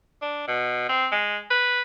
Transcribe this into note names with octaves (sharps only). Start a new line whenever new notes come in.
D4
B2
C4
G#3
B4